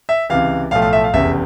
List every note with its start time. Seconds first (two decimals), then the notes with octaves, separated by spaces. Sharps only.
0.09 E5
0.30 C#2 C3 E3 F5
0.71 B1 A2 F3 A3 F5
0.82 F5
0.93 E5
1.04 F5
1.13 F1 E2 C#3 E5